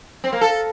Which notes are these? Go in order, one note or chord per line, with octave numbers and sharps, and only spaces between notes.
C4
A#3
A4